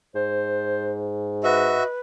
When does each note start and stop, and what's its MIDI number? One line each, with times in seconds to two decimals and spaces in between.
0.15 1.79 44
0.15 1.07 72
1.44 1.83 66
1.44 2.00 71
1.44 1.87 75
1.44 1.83 76